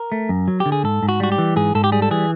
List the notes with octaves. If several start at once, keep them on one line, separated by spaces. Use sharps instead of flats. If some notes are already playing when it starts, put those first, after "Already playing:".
Already playing: A#4
A3
F#2
F#3
G4
D3
G#4
G#2 A4
G#2
F#4
G3 F#4
G4
E3
G#2 G#4
G#2 A4
G4
G3 G#4
A4
E3 G#4